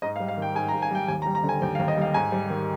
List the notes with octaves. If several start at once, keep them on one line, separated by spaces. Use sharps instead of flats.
G#2 D#5
F5
G3
F5
D#3 G5
G#2 G#5
A#5
G#2
G#5
G3 G5
D#2 G#5
A#5
G3
A#5
D3
G#5
D#2 G5
F5
D#2
D#5
G3 F5
G#2 G#5
G3
D#3